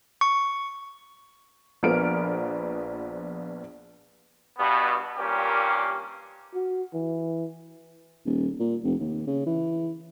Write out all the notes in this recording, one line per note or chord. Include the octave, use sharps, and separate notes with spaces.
C#6
A#1 F3 B3 A#4 F6 D7
G2 B2 B3
G2 A#2 G3 A#3 C#4 G4
F#4
E3
D#1
A#2
F1
D#2
C#3
E3